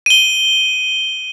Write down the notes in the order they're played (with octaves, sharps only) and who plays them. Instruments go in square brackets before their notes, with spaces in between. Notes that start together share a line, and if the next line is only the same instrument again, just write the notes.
[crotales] D#7 G7